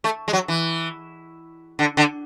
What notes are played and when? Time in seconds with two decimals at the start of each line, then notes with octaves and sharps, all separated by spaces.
0.04 A3
0.28 G#3
0.33 F#3
0.48 E3
1.79 D3
1.97 D3